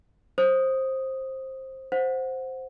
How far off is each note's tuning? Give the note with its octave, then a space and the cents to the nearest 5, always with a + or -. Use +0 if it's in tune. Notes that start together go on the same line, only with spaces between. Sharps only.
C5 +15 D#6 +0
C5 +0 F#5 -15